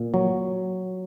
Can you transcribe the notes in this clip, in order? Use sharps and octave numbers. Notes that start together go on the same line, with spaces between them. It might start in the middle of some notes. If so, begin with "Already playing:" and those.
Already playing: A#2
F#3